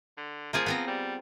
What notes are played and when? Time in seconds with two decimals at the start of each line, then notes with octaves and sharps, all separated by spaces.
0.17 D3
0.53 F3 A#3 F4 G#4
0.66 B3 C4 A#5
0.87 G3